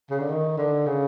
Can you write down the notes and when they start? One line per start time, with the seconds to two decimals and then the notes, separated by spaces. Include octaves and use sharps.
0.10 C#3
0.20 D3
0.29 D#3
0.57 D3
0.87 C#3